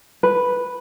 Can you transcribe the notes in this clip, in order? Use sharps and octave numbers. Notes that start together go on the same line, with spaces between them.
B4